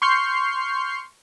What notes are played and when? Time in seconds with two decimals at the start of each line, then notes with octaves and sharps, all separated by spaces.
0.02 C6 C#6 F6 G6 C7